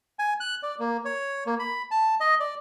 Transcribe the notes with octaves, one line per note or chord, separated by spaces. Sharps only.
G#5
F#6
D5
A#3
C#5
A#3
B5
A5
D#5
D5